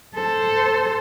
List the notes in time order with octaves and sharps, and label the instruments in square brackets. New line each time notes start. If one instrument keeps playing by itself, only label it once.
[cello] A4 C5